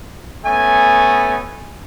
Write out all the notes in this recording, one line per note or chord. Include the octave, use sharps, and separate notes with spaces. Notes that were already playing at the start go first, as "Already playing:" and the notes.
A3 B3 C#4 G#5